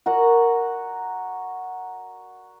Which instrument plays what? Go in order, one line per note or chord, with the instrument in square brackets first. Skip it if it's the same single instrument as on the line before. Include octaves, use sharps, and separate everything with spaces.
[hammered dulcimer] F#4 A#4 D5 F#5